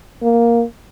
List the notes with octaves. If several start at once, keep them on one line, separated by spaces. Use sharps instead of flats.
A#3